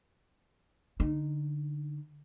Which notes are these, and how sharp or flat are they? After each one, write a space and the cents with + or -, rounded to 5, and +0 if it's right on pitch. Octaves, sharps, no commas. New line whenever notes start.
D3 +0 D#4 -15